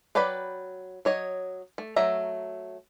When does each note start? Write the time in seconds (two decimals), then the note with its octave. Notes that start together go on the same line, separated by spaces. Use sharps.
0.15 F#3 B4 D5 G5 B5
1.05 F#3 C#5 D#5
1.78 A3
1.96 F#3 A3 E5 A#5